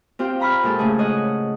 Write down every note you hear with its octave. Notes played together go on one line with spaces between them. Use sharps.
C4 F4 G4 F5 G5
F5 A#5 B5 C#6 F6
A#2 G#3 G4 A4
A2 C#3 G#3 A3 G#4
C#5 D#5 F#5